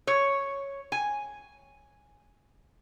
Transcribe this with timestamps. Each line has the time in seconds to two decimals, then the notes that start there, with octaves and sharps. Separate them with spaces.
0.07 C#5
0.92 G#5